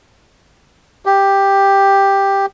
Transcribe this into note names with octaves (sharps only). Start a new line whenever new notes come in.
G4